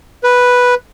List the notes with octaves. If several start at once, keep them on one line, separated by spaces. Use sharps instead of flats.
B4